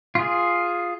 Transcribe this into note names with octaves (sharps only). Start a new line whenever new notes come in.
F4 G#4